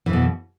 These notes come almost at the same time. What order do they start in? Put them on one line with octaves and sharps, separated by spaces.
E3 F2 B2